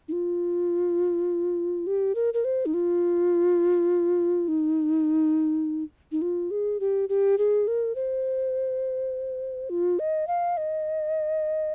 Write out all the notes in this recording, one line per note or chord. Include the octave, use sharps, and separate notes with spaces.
D#4
F4
G4
A#4
A#4
C5
D#4
F4
D#4
D#4
F4
G#4
G4
G4
G#4
A#4
C5
F4
D#5
F5
D#5